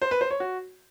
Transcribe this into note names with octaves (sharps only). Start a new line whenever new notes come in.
C5
B4
C5
C#5
F#4